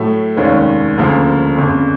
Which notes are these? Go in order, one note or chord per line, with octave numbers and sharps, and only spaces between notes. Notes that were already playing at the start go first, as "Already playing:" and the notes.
Already playing: A2 F#3 A3
F1 D#2 D#3 G#3 C#4
D2 C#3 F3 A#3
G1 F2 C#3